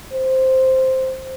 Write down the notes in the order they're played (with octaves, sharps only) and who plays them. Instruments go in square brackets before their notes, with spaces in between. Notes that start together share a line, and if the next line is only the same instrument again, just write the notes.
[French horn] C5